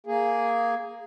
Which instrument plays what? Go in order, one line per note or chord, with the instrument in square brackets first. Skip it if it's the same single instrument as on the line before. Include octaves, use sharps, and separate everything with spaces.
[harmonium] A#3 G#4